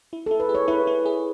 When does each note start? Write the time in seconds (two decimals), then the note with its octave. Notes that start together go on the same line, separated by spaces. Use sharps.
0.13 E4
0.26 E4 A4
0.40 B4
0.49 G#4
0.55 C#5
0.68 E4 B4
0.87 E4
1.06 G#4